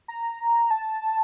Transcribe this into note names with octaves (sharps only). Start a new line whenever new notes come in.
A#5
A5